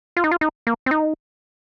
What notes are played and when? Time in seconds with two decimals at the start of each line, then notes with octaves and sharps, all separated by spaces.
0.17 F4
0.24 D#4
0.31 F4
0.41 D#4
0.67 A#3
0.86 C4
0.91 D#4